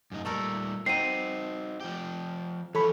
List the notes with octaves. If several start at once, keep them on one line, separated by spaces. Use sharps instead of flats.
F#2 D#4
A#2 G3 A3 A4 A#4
C4 D#4 F#4 A#5 C7 D#7
F3 G4
E3 F3 A4 C#5 B5